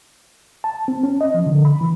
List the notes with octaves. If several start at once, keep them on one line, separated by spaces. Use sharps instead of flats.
A5
C4
C#4
D#5
F3
D3
B5
E3